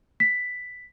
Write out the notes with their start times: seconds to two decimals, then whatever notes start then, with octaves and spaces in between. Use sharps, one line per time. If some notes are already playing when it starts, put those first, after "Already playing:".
0.20 B6